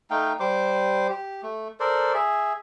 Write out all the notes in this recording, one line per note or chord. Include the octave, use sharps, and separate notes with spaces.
A3 D#4 F5 G5
G3 C5 D6
G4
A3
A4 A#4 C5 D5
G#4 E5